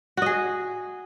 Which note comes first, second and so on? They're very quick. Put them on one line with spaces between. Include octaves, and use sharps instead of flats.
F#4 D#5 G#4